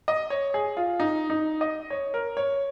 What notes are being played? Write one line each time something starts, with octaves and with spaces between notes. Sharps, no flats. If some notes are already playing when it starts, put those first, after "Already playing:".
D#5
C#5
G#4
F4
D#4
D#4
D#5
C#5
A#4
C#5